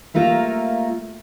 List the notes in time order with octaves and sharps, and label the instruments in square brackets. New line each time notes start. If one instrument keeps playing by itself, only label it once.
[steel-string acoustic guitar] G3 A3 A#3 F4 A#4 E5